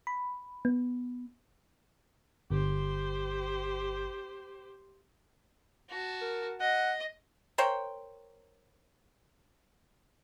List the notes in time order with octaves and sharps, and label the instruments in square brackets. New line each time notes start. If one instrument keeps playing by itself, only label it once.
[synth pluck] B5
B3
[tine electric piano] G1 [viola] G4 C5
[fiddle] F#4 A5
[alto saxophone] A#4
[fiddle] D#5 [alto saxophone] F#5
[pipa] A#4 C5 C#5 G5